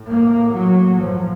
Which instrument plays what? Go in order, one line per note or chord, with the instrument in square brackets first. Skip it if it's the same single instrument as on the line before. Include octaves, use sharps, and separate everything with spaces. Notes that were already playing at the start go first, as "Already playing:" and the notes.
Already playing: [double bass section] A2
A#3
F#3
F3